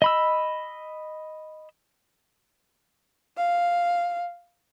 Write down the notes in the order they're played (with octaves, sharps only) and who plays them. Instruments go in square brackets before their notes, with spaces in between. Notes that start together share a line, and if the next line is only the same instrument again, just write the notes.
[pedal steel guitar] D#5 B5 E6
[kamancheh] F5